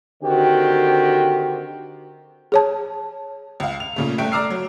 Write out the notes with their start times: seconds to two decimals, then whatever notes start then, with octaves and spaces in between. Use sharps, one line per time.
0.23 D3 D#3 C4 F#4 G4
2.52 G#4 C#5 A5
3.60 C#2 F5
3.80 F7
3.96 A#2 C#3 A3
4.18 G1 A3 G5 D7
4.32 D5 A#5 D6 E6 F6 C7
4.50 F#3